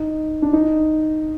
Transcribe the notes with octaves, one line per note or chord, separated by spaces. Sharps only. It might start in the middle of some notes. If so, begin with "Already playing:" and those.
Already playing: D#4
D4
D#4